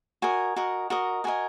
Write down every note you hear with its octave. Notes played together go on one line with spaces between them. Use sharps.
F#4 A#4 D#5 G#5
F#4 A#4 D#5
F#4 A#4 D#5
F#4 A#4 D#5 G#5